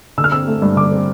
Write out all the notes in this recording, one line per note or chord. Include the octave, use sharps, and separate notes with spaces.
D3 E6
F6
C4 E6
A3
G2
D3 D6
C4